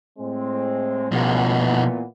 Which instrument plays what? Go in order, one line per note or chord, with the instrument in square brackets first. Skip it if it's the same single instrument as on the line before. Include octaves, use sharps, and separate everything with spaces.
[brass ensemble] A2 G#3 C4
[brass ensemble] C#2 [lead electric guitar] B2 F3
[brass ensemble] A#2 E3 B3